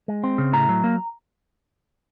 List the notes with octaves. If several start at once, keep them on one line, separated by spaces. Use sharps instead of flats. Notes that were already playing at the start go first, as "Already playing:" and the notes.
G#3
C4
C#3
A2 A#5
F#3
A#3